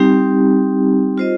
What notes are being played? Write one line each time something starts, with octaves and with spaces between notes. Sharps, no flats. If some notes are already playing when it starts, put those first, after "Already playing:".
Already playing: G3 C4 D#4 G4
F4 C5 D#5